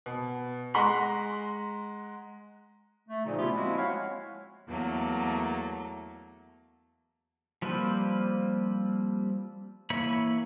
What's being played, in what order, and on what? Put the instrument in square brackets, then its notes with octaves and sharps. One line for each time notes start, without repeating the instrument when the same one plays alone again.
[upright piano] B2
G#3 F#5 A#5 C6 B6 F#7
[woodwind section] A3
A#2 C#3 F3 D#4
A3 B3 C#4 E4 F4 G4
F3 G#3 A#3 C4 E4 F#4
C#5 F5 F#5 G#5 B5 C#6
[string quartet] E2 F#3 A3 A#3
[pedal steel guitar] F3 G3 A#3 C4 B4
E3 A#3 C#5 B5